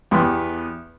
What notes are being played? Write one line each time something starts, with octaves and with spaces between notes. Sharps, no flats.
E2 B3 G4 G5 C6